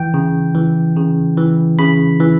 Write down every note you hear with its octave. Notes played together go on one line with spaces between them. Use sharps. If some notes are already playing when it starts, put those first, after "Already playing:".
Already playing: E3 G5
C#3
E3
C#3
E3
C#3 B5
E3